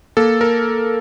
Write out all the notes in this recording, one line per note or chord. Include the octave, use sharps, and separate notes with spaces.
A#3 A4
A#4